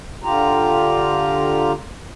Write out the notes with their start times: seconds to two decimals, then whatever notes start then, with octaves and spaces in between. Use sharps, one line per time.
0.24 D3 F4 G4 A#5